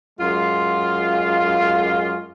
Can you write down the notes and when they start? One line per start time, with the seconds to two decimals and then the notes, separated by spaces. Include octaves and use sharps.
0.20 F#2 G#3 F4